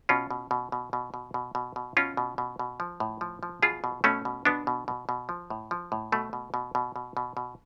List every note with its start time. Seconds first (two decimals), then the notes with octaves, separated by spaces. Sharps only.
0.09 B2 C#4 F4
0.30 B2
0.51 B2
0.72 B2
0.93 B2
1.14 B2
1.34 B2
1.55 B2
1.76 B2
1.97 B2 C#4 F4
2.17 B2
2.38 B2
2.59 B2
2.80 F3
3.00 A2
3.21 F3
3.43 F3
3.62 B2 F4 G#4
3.84 B2
4.04 B2 A3 C#4
4.25 B2
4.45 B2 B3 D4
4.67 B2
4.88 B2
5.09 B2
5.29 F3
5.50 A2
5.71 F3
5.92 A2
6.12 B2 A3
6.33 B2
6.54 B2
6.75 B2
6.96 B2
7.17 B2
7.37 B2